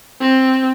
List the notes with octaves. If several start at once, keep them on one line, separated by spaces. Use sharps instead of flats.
C4